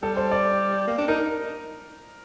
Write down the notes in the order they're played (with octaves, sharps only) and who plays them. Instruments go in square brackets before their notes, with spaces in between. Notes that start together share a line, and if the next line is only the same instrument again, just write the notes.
[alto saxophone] G3 [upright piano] A4
[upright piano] C5
D5
[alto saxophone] A#3
D4
[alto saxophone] D#4 [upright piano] A#4